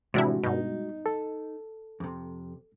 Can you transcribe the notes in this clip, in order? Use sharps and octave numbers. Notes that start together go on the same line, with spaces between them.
A2 C3 E3 F3 G#3 D4 E4 F#4
G2 B2 D#4
A4
F2 C3